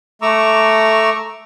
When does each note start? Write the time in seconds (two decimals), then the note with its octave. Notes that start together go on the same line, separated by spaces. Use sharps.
0.22 A3 A#5 C#6 D6 E6